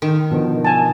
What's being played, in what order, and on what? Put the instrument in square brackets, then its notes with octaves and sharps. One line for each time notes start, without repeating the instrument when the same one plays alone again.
[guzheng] D#3
[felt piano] B2 D3 F3
[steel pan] G#5 A5